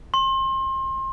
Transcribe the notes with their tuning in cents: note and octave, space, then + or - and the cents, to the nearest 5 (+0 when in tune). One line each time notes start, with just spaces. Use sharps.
C6 +30